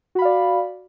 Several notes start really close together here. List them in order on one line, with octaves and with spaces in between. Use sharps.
F#4 B5 F5 D5